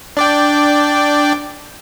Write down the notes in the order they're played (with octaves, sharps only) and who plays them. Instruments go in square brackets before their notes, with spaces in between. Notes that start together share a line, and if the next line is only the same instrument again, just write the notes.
[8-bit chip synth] D4 D5 G5